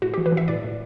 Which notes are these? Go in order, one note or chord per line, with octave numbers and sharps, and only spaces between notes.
A2 F#4
E3 G4
B4
E3 E5
A2 D5
A2